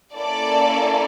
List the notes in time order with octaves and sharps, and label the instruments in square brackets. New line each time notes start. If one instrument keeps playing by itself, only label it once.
[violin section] A#3 C#4 E4 A4 D5